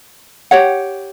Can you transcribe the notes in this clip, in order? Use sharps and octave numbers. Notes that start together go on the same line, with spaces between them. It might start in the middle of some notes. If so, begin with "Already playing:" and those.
G4 C#5 F#5